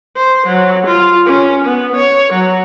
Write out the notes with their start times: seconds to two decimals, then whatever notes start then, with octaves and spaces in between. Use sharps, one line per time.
0.17 C5
0.47 F#3
0.87 F4
1.26 C#4
1.65 B3
1.96 C#5
2.33 F#3